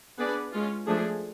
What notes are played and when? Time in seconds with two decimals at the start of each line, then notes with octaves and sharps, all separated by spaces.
0.18 B3 D4 G#4 B4 D5
0.52 G#3 C#4 F4
0.87 F3 A3 D4 G#4